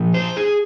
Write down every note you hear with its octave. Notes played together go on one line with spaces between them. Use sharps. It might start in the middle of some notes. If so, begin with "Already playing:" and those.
Already playing: A#2 F3
C5
G#4